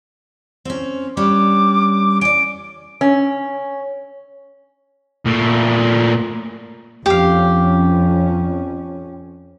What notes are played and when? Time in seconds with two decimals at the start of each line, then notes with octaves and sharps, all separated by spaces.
0.65 C4 C#4
1.17 G3 C#4 D4 D6
2.21 C#4 D5 D7
3.01 C#4
5.26 A#2 A3
7.06 F2 C#4 G4 F5